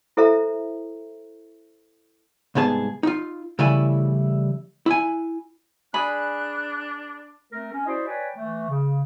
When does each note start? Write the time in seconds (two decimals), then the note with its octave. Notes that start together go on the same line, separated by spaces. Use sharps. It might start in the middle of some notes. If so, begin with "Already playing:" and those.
0.17 E4 A4 C5 E5 A#5
2.55 C2 G#2 B3 G#4 A5
3.03 D#4 F4
3.59 C#3 E3 G3 A3 E4 G#5
4.86 E4 G#5
5.94 D4 G#4 D5 G#5 B5 F#6
7.52 A3 C4 A#4
7.73 C#4
7.86 E4 F#4 C5 D5 D#5
8.06 B4 C#5 D5 G5 G#5
8.35 E3 A3
8.68 C#3